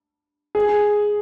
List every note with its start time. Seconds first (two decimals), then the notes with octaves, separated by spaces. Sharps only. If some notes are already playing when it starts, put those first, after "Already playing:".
0.55 G#4